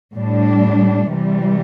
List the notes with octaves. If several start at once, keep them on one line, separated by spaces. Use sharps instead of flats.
A2 G3 D4
C3 E3 G3